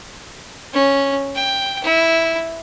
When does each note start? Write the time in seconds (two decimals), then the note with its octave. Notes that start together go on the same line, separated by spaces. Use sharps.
0.73 C#4
1.36 G5
1.84 E4